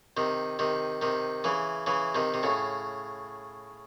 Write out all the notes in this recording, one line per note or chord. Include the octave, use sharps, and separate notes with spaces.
C3 D#3
C3 D#3
C3 D#3
C#3 E3
C#3 E3
C3 D#3
C3
A2 C#3